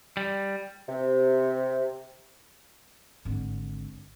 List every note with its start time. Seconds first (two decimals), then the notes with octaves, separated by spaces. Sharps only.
0.17 G3
0.89 C3
3.25 G#1 D3